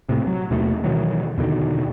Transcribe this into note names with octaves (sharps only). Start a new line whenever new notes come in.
A2 C3
F#3
D#2 B2 A3
B2 D#3 E3 F#3
E2 B2 D3 D#3